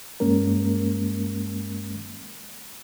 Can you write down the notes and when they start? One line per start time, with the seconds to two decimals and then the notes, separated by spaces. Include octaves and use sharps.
0.20 G2 G#3 A#3 C#4 A#4